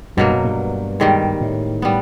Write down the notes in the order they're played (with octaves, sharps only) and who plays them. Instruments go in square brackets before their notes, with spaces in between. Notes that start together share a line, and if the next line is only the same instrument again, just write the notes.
[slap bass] G2 [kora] B2 F#3 A#3
[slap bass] F#2
G2
[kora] G#2 D#3 G3
[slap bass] A2
[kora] G3 B3